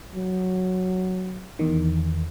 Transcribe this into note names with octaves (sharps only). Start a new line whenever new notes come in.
F#3
E2 D#3